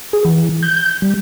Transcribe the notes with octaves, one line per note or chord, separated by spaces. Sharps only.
G#4
E3
G6
G3